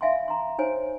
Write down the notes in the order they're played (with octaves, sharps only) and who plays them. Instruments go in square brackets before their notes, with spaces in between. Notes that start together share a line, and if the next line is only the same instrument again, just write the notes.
[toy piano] E5 F5 G#5 B5 C6
A#5 C6
D#4 C5 C#5 G#5